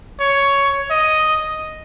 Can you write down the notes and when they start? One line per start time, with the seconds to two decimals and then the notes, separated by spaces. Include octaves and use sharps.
0.20 C#5
0.91 D#5